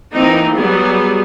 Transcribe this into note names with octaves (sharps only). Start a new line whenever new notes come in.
E3 A#3 C4 D#4
F#3 G3 B3 G#4